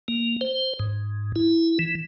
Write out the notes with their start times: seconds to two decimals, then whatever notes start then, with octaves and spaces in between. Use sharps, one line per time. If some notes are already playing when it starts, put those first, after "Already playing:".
0.08 A#3
0.41 C5
0.79 G#2
1.36 E4
1.79 E3